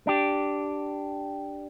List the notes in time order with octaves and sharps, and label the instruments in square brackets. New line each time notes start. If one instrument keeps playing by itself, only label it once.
[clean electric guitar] D4 G4